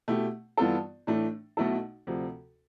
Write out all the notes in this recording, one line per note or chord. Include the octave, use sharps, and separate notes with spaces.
B2 A3 E4 G4
G2 E3 B3 F4 A4
A2 E3 A3 D4
B1 B2 A3 E4 A4
D2 C3 F3